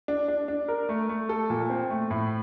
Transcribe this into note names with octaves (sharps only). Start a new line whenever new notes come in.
D4
D4
D4
A#4
A3
A3
A4
A#2
C4
A3
A2